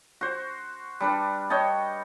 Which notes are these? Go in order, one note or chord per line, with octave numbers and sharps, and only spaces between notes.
F#4 C5
G3 D4 B4
C#5 D#5 G5 A5